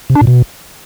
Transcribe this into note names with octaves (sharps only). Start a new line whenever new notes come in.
C3
D4
A#2
B2